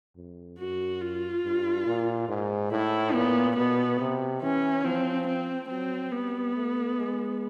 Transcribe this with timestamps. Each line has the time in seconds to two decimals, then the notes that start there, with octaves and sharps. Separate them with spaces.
0.16 F2
0.58 F#2 F#4
1.02 F4
1.44 G2
1.86 A#2
2.29 G#2
2.71 A2 E4
3.14 A#2 B3
3.56 B2 B3
3.99 C3
4.42 E3 C#4
4.84 F3 C4
5.27 C4
5.69 F#3 C4
6.12 G3 B3
6.55 A3
6.98 G#3